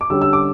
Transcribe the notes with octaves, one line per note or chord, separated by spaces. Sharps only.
D6
D3 G3 C#4 E6
E6
D6